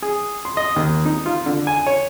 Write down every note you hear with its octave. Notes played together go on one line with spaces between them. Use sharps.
G#4
C6
D#5
D#2
D#4
F4
D3
G#5
C#5